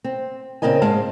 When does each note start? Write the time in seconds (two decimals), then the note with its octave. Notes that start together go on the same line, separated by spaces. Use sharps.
0.04 C4
0.62 A#2 C#3 C4 A#4 D#5 G#5
0.82 G#2 G#3 F5 A5